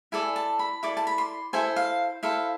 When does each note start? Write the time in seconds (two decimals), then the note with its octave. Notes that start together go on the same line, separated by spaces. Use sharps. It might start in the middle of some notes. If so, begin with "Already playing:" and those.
0.12 E4 A4 D5 G#5
0.36 A5
0.59 B5
0.83 E4 A4 D5 D6
0.97 A5
1.07 B5
1.18 C6
1.53 E4 A4 C5 G#5
1.76 F5
2.23 E4 A4 C5 F5